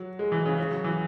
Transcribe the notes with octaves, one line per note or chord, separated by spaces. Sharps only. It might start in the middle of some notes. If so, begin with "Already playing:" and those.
Already playing: F#3
G#3
E3
C#3
C#3
F#3
E3